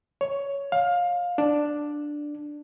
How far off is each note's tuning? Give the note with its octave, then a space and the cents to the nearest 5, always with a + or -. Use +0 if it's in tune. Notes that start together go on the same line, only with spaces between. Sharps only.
C#5 +10
F5 +20
D4 +5